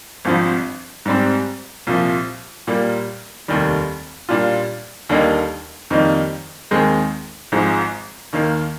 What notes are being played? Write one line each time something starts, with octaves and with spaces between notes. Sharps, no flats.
G#1 G2 F3 C4
G#2 G3 C4
C2 A#2 F3
A#2 G3 A#3
F1 D#2 D#3 G3
A#2 G3 D4 F4
D#2 D3 G3 A#3 D#4
F2 D#3 G3 A#3 D#4
D#2 D#3 G#3 C4 D#4
G#1 G#2 F3 G#3
D#2 D#3 A#3